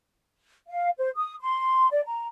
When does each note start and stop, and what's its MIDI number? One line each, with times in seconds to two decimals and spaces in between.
0.68 0.89 77
0.98 1.10 72
1.16 1.35 87
1.41 1.88 84
1.91 2.01 74
2.05 2.26 82